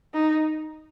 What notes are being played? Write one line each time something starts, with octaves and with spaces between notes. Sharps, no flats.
D#4